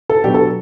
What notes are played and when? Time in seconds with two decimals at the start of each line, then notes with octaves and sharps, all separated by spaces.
0.09 A4
0.24 B2 F#3 B3 D4 G4
0.34 A4